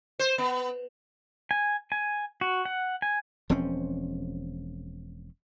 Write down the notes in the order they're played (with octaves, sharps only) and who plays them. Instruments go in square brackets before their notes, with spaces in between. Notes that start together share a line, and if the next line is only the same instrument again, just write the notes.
[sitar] C5
B3
[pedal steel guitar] G#5
G#5
F#4
F#5
G#5
[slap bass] E1 F3 C4 C#4